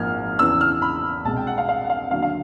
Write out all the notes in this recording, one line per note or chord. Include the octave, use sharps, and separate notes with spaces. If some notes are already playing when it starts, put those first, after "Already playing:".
Already playing: G#1 G#2 F3 A#3 F6 G#6
E2 C#3 E3 E6
F6
B5
C2 B2 G#3 A5
G5
F#5
F5
F5
F#5
F5
D#2 D3 F#3 F5
F5